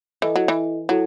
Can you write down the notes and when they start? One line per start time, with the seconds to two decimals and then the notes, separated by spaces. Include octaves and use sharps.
0.22 E3 E4 A4 D#5
0.36 F#3
0.48 E3
0.89 F#3 E4 A4